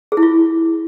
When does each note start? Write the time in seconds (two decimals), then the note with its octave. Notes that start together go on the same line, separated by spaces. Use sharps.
0.12 G#4
0.17 E4
0.23 F4